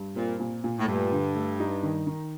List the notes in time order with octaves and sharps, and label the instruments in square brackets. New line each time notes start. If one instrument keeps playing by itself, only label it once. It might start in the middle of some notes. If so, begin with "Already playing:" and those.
Already playing: [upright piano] G2
[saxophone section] A#2 [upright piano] C4
[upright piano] A#2
A#2
[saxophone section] A2
[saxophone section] G2 [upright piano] A3
[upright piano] D3
A3
D#4
D#3
D#3